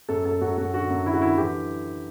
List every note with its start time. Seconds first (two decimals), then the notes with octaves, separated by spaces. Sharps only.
0.09 F#2 A4
0.25 F#2 A4
0.41 F#2 F#4
0.57 F#2 F#4
0.74 D3 F#4
0.90 F#2
1.06 D3 E4
1.14 F#4
1.21 D3 E4
1.38 E3 G4